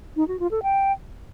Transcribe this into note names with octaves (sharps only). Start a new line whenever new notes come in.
D#4
F#4
F4
A4
G5